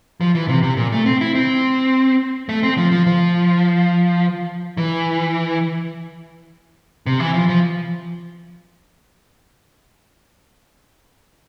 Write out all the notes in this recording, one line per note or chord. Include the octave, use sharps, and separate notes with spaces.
F3
E3
C3
C3
A#2
A3
C4
E4
C4
A3
C4
F3
F3
F3
E3
C3
E3
F3
F3